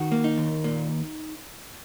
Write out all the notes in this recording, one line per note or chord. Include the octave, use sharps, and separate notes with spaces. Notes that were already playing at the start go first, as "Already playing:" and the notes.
Already playing: D#3 F#4
A#3
D#4
D#2
A#2